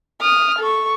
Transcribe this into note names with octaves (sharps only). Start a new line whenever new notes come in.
D#6 F6
A4 C#6